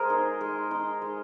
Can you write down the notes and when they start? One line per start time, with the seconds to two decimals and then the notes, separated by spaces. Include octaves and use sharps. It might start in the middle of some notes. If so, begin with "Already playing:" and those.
Already playing: G#3 G#4 A#4 C5
0.10 D#4
0.41 G#3
0.71 D#4
1.02 G#3